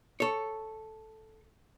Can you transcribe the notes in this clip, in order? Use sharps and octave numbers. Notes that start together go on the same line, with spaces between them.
A4 C#5